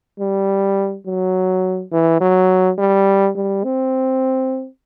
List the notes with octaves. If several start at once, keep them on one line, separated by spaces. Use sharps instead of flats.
G3
F#3
E3
F#3
G3
G3
C4